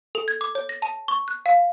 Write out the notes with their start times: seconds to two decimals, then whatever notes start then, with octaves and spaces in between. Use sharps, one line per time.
0.15 A4
0.28 G#6
0.41 D6
0.55 C#5
0.69 A#6
0.82 A5
1.08 C#6
1.28 F#6
1.46 F5